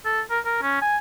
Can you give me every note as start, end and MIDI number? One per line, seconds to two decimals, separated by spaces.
0.05 0.21 69
0.30 0.39 70
0.45 0.61 70
0.62 0.79 61
0.82 0.98 80